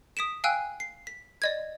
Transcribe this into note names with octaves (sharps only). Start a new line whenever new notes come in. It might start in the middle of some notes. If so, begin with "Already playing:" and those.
D#6 B6 D7 E7
F5 G5 G#5 E6 F#6
C7
B6
D5 D#5 G#6